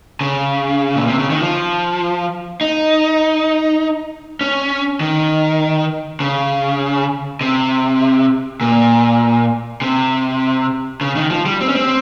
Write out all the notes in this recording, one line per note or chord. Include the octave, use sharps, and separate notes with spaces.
C#3
A#2
C3
C#3
D#3
F3
D#4
C#4
D#3
C#3
C3
A#2
C3
C#3
D#3
F3
G3
C4
C#4
C4